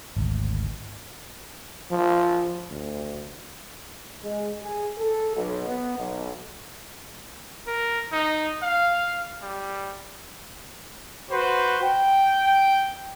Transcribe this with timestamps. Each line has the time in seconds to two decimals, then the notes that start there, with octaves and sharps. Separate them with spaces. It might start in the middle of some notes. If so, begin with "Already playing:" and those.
0.17 G#1 D2
1.91 F3
2.70 D2
4.23 G#3
4.62 G#4
4.98 A4
5.36 B1
5.67 B3
5.97 B1
7.67 A#4
8.12 D#4
8.62 F5
9.42 G3
11.30 F#4 B4 C5
11.83 G5